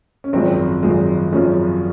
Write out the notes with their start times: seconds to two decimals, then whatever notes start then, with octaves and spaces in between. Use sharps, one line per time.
0.24 C#4
0.33 G#1 F#2 F3 G#3 C4
0.83 G#1 F#2 F3 G#3
1.32 G#1 F#2 F3 G#3 C#4